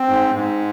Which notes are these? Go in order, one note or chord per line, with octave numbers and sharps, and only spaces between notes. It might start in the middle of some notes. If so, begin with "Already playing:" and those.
Already playing: C4
G#2
G#2